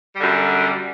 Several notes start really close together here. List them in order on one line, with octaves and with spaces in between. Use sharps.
G3 D3 F#2